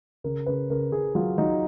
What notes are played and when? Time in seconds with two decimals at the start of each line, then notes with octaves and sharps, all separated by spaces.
0.24 C#3 A#4
0.46 C#3 B4
0.70 C#3 A#4
0.92 C#3 G#4
1.15 F#3 F4
1.38 F#3 D#4